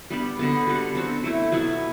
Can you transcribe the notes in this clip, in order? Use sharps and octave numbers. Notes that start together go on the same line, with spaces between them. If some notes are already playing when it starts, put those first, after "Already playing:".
G3 B3 D4 G4
D3 F#3 B3
G3 B3 F#4
F#3 C4 F#4
F#3 A3 E4
B2 F#3 B3 E4